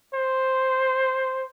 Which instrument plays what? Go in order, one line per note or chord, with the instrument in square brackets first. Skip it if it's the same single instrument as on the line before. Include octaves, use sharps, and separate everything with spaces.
[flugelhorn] C5